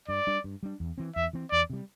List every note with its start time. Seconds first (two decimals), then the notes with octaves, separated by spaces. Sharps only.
0.08 G2 D5
0.27 G3 D4
0.44 G2
0.63 G3 D4
0.80 E2
0.98 E3 C4
1.15 E2 E5
1.33 E3 C4
1.51 E2 D5
1.70 C3 G3